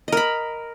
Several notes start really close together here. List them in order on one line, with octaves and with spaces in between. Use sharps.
D#5 A#4 B5